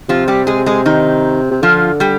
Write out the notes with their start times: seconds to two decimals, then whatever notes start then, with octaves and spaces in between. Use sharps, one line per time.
0.09 C3 F3 F4
0.28 G3 G4
0.47 G#3 G#4
0.66 G#3 G#4
0.86 D#3 D#4
1.51 C3
1.62 D3 F3 F4
2.00 G3 G4